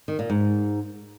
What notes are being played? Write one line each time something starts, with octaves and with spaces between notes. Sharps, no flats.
D#3
A#2
G#2